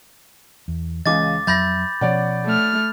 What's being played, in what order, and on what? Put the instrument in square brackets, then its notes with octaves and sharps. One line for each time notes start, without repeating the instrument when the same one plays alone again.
[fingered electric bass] E2
[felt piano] C#2 C#3 D#5 [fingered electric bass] E3 [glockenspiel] D6 A6
[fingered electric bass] F2 F#3 [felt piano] E5 A#6 [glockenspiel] B5 G6 A6
[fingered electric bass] B2 F3 C#4 [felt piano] C#5 D5 F#5
[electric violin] A3 F6